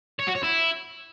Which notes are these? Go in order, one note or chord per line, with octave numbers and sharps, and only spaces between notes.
C#5
F#4
C#5
E4